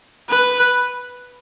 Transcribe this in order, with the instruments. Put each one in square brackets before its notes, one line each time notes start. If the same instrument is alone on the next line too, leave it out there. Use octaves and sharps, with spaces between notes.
[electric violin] B4